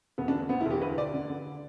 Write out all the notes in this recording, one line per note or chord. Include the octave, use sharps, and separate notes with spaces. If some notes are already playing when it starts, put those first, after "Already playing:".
E1 B3
D4
D3
D2 B3
E4
E1 G4
D2 B4
D2 D5
D3
D3